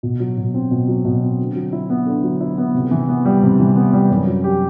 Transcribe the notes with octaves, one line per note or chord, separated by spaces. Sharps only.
B2
F#3
B2
C4
B2
F#3
B2
C4
D3
F#3
E4
B3
D3
F#3
E4
B3
C3
E3
B3
G3
C3
E3
B3
G3
F#2
F#3
G4